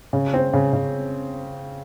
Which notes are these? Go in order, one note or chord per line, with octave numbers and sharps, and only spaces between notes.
C#3
C4
C#3
C#3